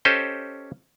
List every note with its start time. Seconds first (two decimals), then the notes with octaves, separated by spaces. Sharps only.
0.05 C#4 G4 A4 C5 D#5